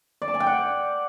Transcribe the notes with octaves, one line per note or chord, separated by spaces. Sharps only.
D5
A5
G#5
G5
F#5